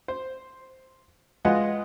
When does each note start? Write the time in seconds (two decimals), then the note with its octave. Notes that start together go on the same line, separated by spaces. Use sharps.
0.08 C5
1.45 G#3 F4 B4 D#5 F#5